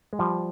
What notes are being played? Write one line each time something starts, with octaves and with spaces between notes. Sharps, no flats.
G#3
F3 G3